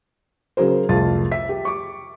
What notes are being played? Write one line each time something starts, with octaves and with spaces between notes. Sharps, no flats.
C#3 F#3 G#4 A#4 C5
C2 F2 A3 F4 G#4 A6
E5 B6
G4
C#6 D6